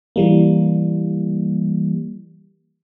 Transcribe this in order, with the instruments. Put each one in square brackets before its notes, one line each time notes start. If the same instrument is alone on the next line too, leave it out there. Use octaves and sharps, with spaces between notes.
[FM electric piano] E3 G3 A#3